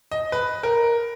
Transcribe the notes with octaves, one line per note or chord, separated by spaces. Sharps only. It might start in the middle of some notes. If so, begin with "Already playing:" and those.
D#5
B4
A#4